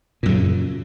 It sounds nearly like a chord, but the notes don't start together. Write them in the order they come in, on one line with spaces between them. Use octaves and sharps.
A#2 F#2 C#3